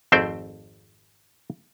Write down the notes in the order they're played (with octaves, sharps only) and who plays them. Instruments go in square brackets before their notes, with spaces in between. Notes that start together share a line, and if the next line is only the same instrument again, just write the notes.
[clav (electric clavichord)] G#1 F2 A3 C4 C5 G5